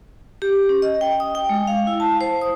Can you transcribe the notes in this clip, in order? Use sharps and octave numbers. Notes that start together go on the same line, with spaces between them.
G4
C#4
D#5
G5
D#6
G5
G#3
F5
E4
A5
C5
D#6